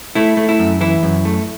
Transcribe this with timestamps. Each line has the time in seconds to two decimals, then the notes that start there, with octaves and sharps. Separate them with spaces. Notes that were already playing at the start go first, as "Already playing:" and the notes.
0.15 A3 E4
0.37 A3
0.49 E4
0.59 F#2
0.81 E3 E4
1.03 F#2
1.25 A3